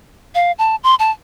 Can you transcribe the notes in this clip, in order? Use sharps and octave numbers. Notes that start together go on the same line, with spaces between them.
F5
A5
C6
A5